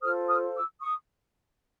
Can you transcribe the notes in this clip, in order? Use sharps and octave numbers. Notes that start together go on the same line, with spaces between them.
F4 A4 C5 D#6 F6
D#6 F6
D6 E6
C#6 D#6